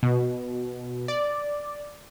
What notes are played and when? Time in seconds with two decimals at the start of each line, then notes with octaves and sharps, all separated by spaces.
0.03 B2
1.08 D5